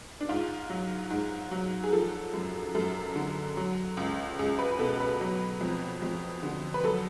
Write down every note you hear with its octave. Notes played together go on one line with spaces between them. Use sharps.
D4
G#2 F4
F#3
G#2
F#3
G#4
F3 A4
F#2
F#2 A4
D3
F#3
C#2
C#2 G#4
B4
B2 A4
B4
F#3
F2
F2
D3
B4
F#3 A4